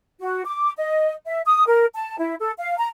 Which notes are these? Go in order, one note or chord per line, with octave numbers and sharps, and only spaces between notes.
F#4
D6
D#5
E5
D#6
A#4
A5
E4
A4
F5
A#5